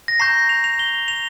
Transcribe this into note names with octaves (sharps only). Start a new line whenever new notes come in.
A#6
A#5 C#6 G6 C7
F7
F7
G7
F7